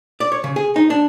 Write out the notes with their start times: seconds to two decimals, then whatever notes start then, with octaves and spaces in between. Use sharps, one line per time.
0.20 D5
0.32 C#5
0.44 C#3
0.56 G#4
0.76 D#4
0.90 D4